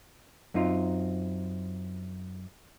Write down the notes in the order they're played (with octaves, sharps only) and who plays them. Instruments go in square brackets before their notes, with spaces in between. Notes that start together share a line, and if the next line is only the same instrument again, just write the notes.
[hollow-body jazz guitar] F#2 C4 D#4 F4